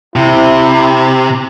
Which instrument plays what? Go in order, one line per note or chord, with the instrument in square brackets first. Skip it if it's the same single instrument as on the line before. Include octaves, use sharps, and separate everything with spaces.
[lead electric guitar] C3 [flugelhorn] E4